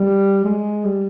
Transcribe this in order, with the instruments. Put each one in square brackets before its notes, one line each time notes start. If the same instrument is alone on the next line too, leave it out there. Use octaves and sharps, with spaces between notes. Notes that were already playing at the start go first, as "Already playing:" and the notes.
Already playing: [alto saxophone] G3
G#3
G3